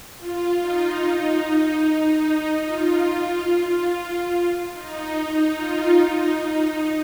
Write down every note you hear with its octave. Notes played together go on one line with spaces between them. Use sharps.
F4
D#4
D#4
F4
F4
F4
D#4
F4
D#4